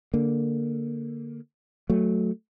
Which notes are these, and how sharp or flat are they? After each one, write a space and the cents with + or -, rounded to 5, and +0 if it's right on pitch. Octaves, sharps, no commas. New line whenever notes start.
D3 +0 A#3 +0
F#3 +0 A3 +0